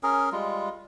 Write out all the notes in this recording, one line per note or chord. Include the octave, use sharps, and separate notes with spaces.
C#4 G#4 A#4
G3 G#3 F4